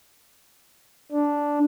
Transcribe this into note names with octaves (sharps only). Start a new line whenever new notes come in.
D4